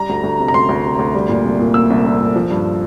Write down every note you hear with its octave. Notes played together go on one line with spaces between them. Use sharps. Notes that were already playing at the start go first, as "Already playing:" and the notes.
Already playing: G3 A#5
D2
D2
C3
A#5
D2 C6
D2
C3
D2
G3
A#2
C2
A#2
A#3 E6
C2
C2
A#2
F3
G2